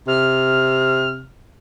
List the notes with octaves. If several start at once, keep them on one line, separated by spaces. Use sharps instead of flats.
C3 F6